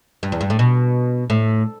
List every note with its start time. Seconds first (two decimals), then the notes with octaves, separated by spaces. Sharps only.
0.23 G2
0.32 E2
0.41 G2
0.50 A2
0.59 B2
1.30 A2